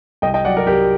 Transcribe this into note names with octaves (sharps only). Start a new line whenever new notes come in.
C2 D#5 G5
D#5 G5
F#3 D5 F#5
A#4 D5
C2 G4 A#4